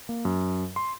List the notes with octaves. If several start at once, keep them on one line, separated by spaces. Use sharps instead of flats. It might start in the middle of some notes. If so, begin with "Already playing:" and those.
A#3
F#2
C6